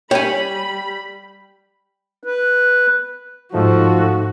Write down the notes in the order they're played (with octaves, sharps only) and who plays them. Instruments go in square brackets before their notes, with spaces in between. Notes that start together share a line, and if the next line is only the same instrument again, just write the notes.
[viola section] G3 B5 [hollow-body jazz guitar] C#5 G#5 [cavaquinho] G5
[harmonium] B4
[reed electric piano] G#2 A3 D#4 [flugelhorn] F3 [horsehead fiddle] F#4 [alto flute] A4